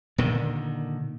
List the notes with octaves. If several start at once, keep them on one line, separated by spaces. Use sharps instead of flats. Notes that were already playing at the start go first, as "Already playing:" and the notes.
A#2 D3 D#3